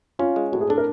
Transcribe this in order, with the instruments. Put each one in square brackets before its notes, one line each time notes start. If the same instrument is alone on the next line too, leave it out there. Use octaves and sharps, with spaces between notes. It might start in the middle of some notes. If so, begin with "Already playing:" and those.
[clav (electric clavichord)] C#4 [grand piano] F4
[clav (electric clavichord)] G#3
[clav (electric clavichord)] A2 [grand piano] F#4
[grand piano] G#4
[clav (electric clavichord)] D4 [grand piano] A4
[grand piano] A#4